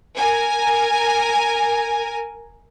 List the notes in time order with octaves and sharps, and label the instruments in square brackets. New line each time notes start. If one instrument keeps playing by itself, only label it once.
[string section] A#4 G#5